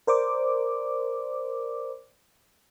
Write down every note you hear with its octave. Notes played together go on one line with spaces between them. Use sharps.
A#4 C5 D5 D6